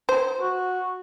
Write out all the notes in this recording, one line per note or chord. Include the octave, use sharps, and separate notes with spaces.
C5
F#4